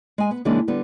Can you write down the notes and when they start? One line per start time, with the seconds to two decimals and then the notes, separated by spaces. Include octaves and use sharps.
0.18 G#3 G#5
0.31 B3
0.45 C#3 E3 G#3 A#3 D4 D#4
0.68 D3 G3 B3